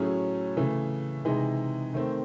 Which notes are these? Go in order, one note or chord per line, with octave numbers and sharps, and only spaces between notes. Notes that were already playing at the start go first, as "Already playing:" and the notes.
Already playing: A2 F#3 A3 C#4 G#4
C#3 E3 A3
C3 E3 G#3 D#4
D#3 A3 C4